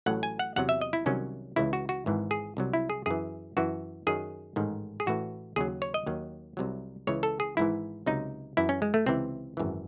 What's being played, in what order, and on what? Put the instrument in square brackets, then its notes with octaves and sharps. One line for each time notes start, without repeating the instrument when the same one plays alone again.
[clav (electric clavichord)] A1 A2 F#3 F#5
G#5
F#5
E2 C3 F#3 F#5
E5
D#5
E4
C2 C3 D#3 F#3 C#4
C#2 C#3 E3 E4
F#4
F#4
G#1 G#2 E3
G#4
C2 C3 F#3
E4
G#4
F#2 E3 G#4
F#2 E3 F#4
F#2 D#3 F#3 G#4
A1 G#2 D#3
G#4
A1 A2 E3 F#4
D#2 C#3 F#3 G#4
C#5
D#5
D#2 D#3 F#3
C2 C3 F#3
C#2 C#3 E3 C#5
A4
G#4
G#1 G#2 E3 E4
C#2 C3 F#3 D#4
F#2 E3 E4
C#4
G#3
A3
C#2 C3 E3 C4
G#1 F#2 E3